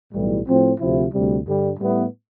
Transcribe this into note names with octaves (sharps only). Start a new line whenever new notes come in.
B1 A2 E3 G3
A2 F3 C4
D2 C3 F3 C4 E4
D2 C3 G3
G2 D3 G3
A2 G3 B3 E4